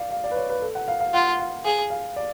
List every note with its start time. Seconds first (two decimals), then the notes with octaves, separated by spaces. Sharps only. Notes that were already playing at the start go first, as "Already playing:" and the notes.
Already playing: D5 F5
0.11 F5
0.24 D5
0.31 B4
0.37 C#5
0.50 B4
0.62 A4
0.75 F#5
0.88 F5
1.00 F5
1.14 F4 F#5
1.39 F5
1.65 G#4 F5
1.90 F5
2.16 D5